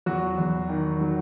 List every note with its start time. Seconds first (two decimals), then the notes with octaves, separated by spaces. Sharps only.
0.06 E2 F#3 F#4
0.38 E2
0.69 D#3
1.01 F#3